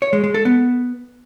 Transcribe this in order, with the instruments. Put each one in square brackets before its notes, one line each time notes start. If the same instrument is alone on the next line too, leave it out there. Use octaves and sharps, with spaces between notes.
[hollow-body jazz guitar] C#5
G#3
G#3
A4
B3